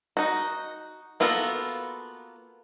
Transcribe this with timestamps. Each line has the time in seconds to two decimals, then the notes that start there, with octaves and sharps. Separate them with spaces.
0.17 D#4 F#4
1.20 A#3 B3 F4 F#4 A4